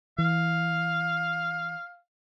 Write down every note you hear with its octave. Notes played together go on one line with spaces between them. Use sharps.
E3 F5